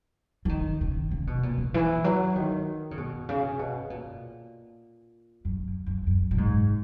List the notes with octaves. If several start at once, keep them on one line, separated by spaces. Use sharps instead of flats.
E3
D#3
C#3
C#3
B2
A#2
C#3
E3
F#3
D#3
C#3
B2
C#3
B2
A#2
F#2
F#2
F#2
A#2
G#2